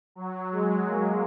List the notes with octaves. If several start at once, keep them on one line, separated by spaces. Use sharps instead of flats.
F#3
G#3
A#3